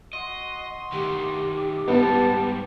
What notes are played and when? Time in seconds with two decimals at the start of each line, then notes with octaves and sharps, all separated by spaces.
0.13 F#4 D#5 C6
0.92 D#3 A3 G4
1.88 G#2 G3 B3 A5